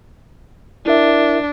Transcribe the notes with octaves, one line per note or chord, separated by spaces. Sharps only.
D4 E4 A#4 E5